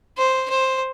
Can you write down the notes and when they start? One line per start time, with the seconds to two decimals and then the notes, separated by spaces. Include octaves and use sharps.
0.18 C5
0.50 C5